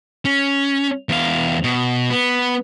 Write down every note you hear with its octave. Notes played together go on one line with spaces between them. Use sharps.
C#4
E2 F5
B2
B3